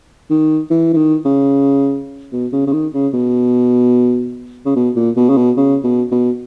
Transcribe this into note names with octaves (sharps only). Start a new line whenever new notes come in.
D#3
E3
E3
D#3
C#3
B2
C#3
C#3
D#3
C#3
B2
C#3
B2
A#2
B2
C#3
B2
C#3
B2
B2